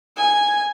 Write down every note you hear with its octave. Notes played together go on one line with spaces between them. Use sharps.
G#5